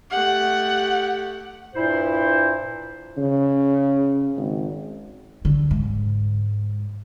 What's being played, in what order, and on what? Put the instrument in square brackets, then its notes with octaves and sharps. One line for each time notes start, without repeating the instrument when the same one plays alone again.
[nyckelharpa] A3 G4 [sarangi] F#5
[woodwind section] G2 A#2 E4 C5
[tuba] C#3
G#1
[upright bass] D3
G#2